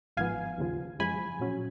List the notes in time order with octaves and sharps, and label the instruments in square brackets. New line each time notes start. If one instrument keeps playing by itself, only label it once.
[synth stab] G#1 G#2 F3 B3 F5 G#5
D#2 C#3 F3
F#2 F3 G#3 G#5 B5
A#2 F#3 C#4